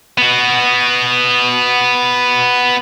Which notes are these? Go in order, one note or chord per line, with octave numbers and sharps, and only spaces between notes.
B3 F#4